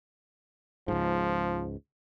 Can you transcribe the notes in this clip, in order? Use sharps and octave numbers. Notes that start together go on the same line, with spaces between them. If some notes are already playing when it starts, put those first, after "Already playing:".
C#2 G#2 F3